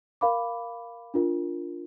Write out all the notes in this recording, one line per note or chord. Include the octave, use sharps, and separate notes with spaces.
A#4 F5 B5 D6
D4 F4 A#4